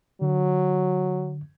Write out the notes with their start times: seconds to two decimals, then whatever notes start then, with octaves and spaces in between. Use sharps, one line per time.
0.22 D3 F#3